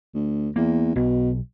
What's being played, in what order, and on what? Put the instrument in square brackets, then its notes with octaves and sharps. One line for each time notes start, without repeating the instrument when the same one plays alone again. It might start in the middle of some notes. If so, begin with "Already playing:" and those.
[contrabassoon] D2
[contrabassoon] E2 [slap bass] A#3
[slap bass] B1 [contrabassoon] B2